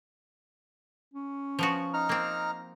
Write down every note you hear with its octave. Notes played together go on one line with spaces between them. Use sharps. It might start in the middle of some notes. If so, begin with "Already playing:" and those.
C#4
F3 B3 F#4
D#4 A#5 F6
A#3 C4